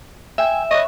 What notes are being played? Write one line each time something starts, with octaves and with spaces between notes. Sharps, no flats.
E5 G5 G#5
B4 C#5 D#5